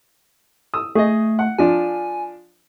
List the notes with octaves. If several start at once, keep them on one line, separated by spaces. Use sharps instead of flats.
D#6 E6
A3 G#4 D#5
F#5
F3 D4 F4 G#5